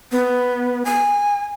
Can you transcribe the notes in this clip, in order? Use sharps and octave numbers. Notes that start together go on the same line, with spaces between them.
B3
G#5